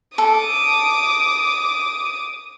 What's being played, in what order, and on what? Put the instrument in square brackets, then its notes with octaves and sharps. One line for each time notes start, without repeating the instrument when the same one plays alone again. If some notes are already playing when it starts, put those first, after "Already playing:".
[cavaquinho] A4 [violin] D6 D#6